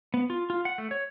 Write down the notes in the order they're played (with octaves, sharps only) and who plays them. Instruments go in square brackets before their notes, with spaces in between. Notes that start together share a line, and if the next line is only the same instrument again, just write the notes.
[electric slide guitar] B3
F4
F4
F#5
A3
C#5